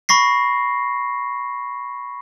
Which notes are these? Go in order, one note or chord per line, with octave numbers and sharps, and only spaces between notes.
B5 C#6 A#6 C7